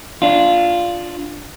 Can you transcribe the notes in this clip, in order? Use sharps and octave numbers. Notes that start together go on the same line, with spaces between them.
D4 F4